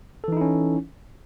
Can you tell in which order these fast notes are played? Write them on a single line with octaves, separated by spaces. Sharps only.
A4 E3 D#4 E4 C#4